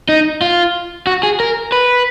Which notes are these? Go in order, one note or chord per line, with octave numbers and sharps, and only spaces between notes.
D#4
F4
F#4
G#4
A#4
B4